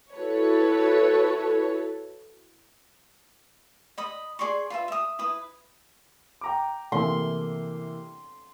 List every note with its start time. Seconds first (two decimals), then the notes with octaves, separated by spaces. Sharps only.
0.14 E4 F#4 A4 B4 C#5
3.98 D#5 B5 D#6
4.39 G#4 D5 C6 C#6
4.70 F4 B4 E5
4.88 E5 D#6
5.19 E4 B4 D#6
6.41 G5 A#5 D6
6.92 C3 E3 A#3 C6